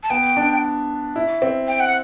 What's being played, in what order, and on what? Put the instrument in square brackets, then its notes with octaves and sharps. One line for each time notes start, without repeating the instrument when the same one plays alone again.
[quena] A5
[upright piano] B3 [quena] G5
[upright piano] D4
E4
C4
[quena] G5
F#5